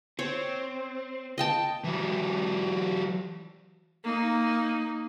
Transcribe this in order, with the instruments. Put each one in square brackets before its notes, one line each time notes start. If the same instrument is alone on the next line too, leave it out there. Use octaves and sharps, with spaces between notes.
[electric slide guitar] C4 [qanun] C#5
[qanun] D#5 G5 A5
[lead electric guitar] E3 F#3
[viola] A#3 D#4